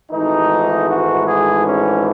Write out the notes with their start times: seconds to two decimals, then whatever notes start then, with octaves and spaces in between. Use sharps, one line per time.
0.12 G#1 G#2 E3 A3 D#4
0.89 F#4
1.28 G#4
1.66 C#4